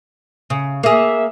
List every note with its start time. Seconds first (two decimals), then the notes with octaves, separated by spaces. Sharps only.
0.50 C#3
0.83 A#3 G#4 E5